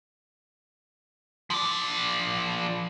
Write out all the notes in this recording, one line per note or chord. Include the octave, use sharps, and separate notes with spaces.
F3 D5